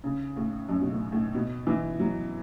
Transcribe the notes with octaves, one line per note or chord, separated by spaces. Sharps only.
C#3
A2
F#2
B2
A2
A2
B2
E3
F#3